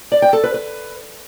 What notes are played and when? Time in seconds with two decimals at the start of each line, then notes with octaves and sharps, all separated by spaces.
0.12 D5
0.22 G5
0.33 A4
0.44 B4
0.54 B4